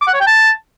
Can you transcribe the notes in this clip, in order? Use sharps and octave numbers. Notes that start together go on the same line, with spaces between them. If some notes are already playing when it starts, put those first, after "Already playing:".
D6
F#5
C#5
G5
A5